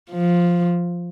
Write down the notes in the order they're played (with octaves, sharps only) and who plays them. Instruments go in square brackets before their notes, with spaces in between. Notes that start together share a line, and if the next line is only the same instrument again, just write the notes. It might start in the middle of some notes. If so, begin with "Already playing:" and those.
[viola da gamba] F3